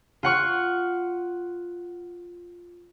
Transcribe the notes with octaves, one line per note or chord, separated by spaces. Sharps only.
F4 F#5 C#6 F6